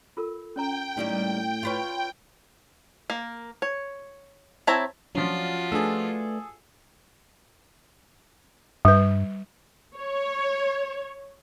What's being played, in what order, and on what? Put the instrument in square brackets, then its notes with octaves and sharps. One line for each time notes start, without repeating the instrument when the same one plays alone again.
[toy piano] F4 A4 A#4
[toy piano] C#4 C#5 A#5 [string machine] G5
[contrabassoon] A2 [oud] D#3 G3 A#3
[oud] F4 B4 C#5
[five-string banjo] A#3
C#5
C4 E4 C#5 A5 A#5
[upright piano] F3 C#4 [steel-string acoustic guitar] F#3 D4 [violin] F4 F#4
[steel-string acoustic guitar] A3 D4 B4 [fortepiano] G#4 A4
[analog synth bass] G2 [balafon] G3 B4
[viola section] C#5